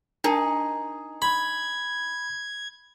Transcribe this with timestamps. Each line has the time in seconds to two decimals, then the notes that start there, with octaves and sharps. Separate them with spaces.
0.24 D4 D#4 G#4 A#4 A5
1.22 B5 C6 G#6